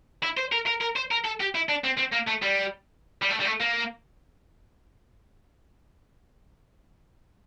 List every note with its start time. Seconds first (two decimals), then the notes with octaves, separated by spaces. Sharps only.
0.23 E4
0.37 C5
0.52 A#4
0.66 A#4
0.81 A#4
0.96 C5
1.11 A#4
1.24 A4
1.40 G4
1.55 E4
1.69 D4
1.84 C4
1.98 C4
2.13 A#3
2.28 A3
2.43 G3
3.22 G3
3.30 A3
3.40 G3
3.45 A3
3.60 A#3